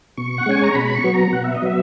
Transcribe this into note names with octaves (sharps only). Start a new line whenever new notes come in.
B2 C#6
F#5
G#3 C#4 G#5
A#5
B2 B5
B5
C#6
F#3 B3
A#5
B2 F#5
E5
D#5
F#3 B3 E5